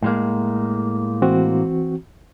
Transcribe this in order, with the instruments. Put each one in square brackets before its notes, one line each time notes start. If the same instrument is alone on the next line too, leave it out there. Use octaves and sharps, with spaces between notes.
[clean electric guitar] A2 G#3 A#3
[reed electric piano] E3 C4 F#4